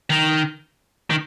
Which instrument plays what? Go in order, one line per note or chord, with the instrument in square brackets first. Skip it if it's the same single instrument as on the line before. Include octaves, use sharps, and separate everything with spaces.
[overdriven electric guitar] D#3
D#3